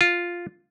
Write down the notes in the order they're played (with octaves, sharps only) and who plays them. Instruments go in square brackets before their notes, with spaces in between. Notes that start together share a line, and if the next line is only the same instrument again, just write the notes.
[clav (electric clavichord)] F4